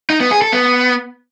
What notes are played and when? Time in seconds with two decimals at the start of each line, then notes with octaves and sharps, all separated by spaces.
0.10 D#4
0.20 B3
0.31 G#4
0.42 A4
0.52 B3